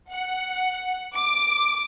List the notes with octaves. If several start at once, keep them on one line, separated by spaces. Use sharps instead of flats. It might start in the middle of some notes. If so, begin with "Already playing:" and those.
F#5
D6